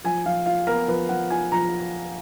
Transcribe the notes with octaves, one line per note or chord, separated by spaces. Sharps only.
F3 G#5
F3 F5
F4 F5
B3 A#4
F3 B4
F3 F#5
F4 G#5
F3 A#5